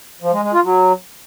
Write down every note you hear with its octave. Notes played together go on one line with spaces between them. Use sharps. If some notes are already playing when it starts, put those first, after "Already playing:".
F3
G#3
G#3
F4
F#3